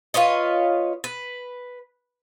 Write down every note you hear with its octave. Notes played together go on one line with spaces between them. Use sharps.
F4 B4 C#5 D#5
B4